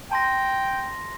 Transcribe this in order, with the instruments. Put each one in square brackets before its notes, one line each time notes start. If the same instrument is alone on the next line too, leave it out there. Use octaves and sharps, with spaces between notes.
[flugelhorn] G5 [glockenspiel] A5 C6 A#6